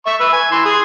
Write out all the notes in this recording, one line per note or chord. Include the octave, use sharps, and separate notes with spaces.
E5 C#6
B4 E6
G#5
E3 C6
G#4